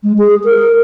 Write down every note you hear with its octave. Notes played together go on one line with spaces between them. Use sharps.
G#3
G#4
A#4